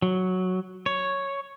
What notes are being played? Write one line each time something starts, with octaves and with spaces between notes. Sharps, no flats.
F#3
C#5